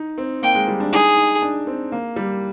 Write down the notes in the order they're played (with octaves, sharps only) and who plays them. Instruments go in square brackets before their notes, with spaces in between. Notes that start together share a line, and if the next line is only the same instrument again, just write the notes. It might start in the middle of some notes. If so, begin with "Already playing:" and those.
Already playing: [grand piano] D#4
C4
[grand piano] A#3 [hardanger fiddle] G5
[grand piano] G#3
G3
D4
[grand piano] D#4 [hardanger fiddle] G#4
[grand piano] D#4
D4
C4
A#3
G3